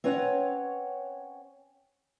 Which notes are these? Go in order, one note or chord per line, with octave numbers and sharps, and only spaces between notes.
C4 C#4 B4 C#5 F#5